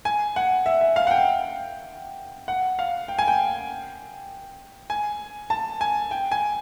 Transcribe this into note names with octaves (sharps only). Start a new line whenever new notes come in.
G#5
F#5
E5
E5
F5
F#5
G5
F#5
F5
G5
G#5
G5
G#5
A5
G#5
G5
G#5